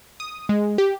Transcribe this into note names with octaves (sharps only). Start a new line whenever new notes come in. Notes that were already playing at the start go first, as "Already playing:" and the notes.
D#6
G#3
G4